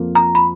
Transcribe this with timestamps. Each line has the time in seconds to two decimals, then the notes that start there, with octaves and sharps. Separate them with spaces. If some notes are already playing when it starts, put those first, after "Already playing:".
Already playing: F2 F3 A#3 F4
0.15 A#5
0.35 B5